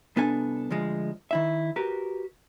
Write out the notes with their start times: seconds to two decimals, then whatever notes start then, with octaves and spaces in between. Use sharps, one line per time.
0.16 C2 B3 D4 A4 G#5
0.71 D2 F3 G#3
1.31 D#3 E4 E5
1.76 F#4 G4 A#4 B4